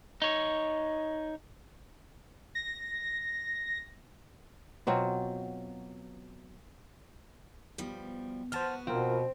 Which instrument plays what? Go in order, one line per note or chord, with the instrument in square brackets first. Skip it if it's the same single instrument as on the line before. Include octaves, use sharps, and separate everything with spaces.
[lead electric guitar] D#4 C#5
[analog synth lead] A#6
[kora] B2 F#3 C4 F4
[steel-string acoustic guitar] B2 F3 G3
[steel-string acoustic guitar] B3 F#4 [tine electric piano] C5 A5 F6
[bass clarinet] B2 [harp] C4 [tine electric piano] F4 A#4